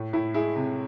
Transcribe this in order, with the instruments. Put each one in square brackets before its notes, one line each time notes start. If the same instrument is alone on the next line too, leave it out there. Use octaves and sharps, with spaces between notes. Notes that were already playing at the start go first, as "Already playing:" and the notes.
Already playing: [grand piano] A2
A2 E4
G#3 E4 G#4
C3